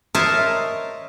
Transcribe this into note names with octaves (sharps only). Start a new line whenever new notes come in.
A#4 C5 C#5 D#5 E5 A5